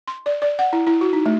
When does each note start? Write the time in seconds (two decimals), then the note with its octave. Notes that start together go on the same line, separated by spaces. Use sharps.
0.07 C6
0.26 D5
0.42 D5
0.59 F#5
0.73 E4
0.87 E4
1.01 F#4
1.13 D#4
1.26 A3